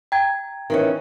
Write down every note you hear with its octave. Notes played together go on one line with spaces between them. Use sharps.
G5 A#5 G#6
D#3 E3 C#4